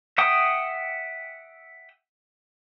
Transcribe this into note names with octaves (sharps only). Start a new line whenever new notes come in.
E5 F#5 G5 D#6